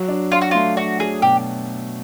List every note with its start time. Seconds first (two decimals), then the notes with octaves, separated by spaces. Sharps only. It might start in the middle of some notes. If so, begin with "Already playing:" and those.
Already playing: F#3
0.08 D4
0.32 D4 F4
0.41 F#4
0.51 A3 F4
0.76 D4 F#4
1.00 F#3 G#4
1.22 B2 G4